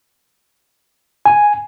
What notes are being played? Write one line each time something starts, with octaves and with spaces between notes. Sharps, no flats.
G#5